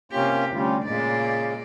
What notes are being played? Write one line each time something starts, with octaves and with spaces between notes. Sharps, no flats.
C3 A#3 C#4 F4 G4
D2 C#3 G3 F4
A#2 C#3 G#3 D5